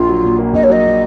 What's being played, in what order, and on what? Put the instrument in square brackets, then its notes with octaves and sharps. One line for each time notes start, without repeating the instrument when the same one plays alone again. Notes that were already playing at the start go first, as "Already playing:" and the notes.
Already playing: [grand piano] A#1 [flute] F4
[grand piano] F#3
A#2
A#3
[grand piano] A#1 [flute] D#5
[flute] C#5
[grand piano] F#3 [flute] D#5
[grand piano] A#2